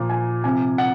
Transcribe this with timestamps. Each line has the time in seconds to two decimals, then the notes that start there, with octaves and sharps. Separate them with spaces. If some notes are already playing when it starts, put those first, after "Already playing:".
Already playing: A#2 F3
0.10 G#5
0.44 C3 F3 G#5
0.78 F#5